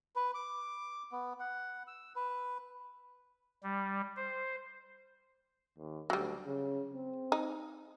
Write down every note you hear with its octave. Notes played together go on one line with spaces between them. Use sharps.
B4
D6
B3
F#5
E6
B4
G3
C5
D#2
D2 F#3 G3
C#3
C4
D#4